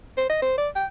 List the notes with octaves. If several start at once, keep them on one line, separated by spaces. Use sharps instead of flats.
C5
D#5
C5
D5
G5